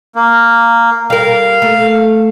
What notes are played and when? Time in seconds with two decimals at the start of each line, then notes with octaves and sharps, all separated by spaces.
0.15 A#3
1.10 G3 A#4 F5
1.62 A3